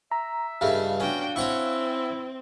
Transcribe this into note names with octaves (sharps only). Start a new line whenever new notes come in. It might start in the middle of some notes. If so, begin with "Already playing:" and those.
E5 A#5
C#2 G2 A3 F5
B3 C#4 D4 F#4 G5
C4 C#4 E4 F#5 C#6